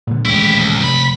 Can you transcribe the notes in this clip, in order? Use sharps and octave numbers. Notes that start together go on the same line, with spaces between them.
A#2 D3
D#1 A1 G#3 E4 G4
C2
F1 C#2 B5